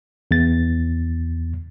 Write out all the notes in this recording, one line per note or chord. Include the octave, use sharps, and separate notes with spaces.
E2 A6